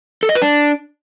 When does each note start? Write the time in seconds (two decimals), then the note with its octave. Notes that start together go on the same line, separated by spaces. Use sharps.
0.23 A4
0.29 D#5
0.35 B4
0.42 D4